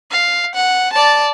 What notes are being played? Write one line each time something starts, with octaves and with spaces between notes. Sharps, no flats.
F5
F#5
D5 A5